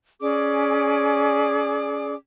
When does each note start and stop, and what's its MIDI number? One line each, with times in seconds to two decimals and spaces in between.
0.21 2.14 61
0.21 2.14 68
0.21 2.14 74
0.21 2.14 86